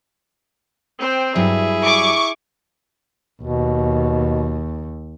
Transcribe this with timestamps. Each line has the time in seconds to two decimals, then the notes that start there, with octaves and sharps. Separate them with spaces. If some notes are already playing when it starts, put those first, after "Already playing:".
0.99 C4 C5 G5
1.35 G2 F#3 G3 E4 G#4
1.84 C#6 D6
3.42 D#2 B2